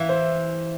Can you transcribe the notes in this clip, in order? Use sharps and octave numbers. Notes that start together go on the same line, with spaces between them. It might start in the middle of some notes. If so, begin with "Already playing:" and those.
Already playing: E3 E5 F5
C5